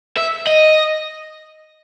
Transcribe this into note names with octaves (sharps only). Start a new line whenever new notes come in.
E5
D#5